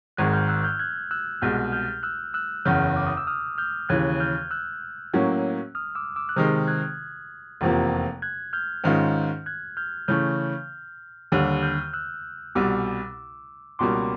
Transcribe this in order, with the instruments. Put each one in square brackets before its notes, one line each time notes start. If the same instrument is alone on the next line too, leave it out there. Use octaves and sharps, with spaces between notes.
[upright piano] G#1 G#2 D#3 G#3 [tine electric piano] F#6 G#6
[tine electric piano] F6 G6
E6 F#6
F6 G6
F#6 G#6
E6 F#6
[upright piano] C2 B2 G#3 [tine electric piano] F6 G6
[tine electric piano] F6 G6
E6 F#6
E6 F#6
[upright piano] F#1 E2 C#3 [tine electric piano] F6 G6
[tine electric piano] D6
D#6
E6
D#6 F6
F6 G6
[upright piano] D#2 C#3 E3 [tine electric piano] F#6 G#6
[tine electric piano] F6 G6
E6 F#6
[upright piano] A2 F#3 A#3 C#4
[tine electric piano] D#6 F6
D6 E6
D6 E6
F#6
[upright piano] C3 D#3 G#3 [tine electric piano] D#6 F6
[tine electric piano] F#6 G#6
[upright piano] F1 E2 C3 F3 A#3
[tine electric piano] F#6 G#6
F6 G6
[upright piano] G#2 D#3 G#3 C#4 F4
[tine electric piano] F#6 G#6
F6 G6
[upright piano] C#3 E3 A3 [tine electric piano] F6 G6
[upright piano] D#2 D3 G3 [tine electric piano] E6 F#6
[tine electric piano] F6 G6
E6 F#6
[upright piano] C2 B2 G3 [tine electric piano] D6 E6
[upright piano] C#2 B2 G3 A#3 [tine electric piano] C6 D6